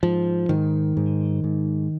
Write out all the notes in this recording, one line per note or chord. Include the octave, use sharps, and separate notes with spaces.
G#2 F3
G#2 D#3
G#2
G#2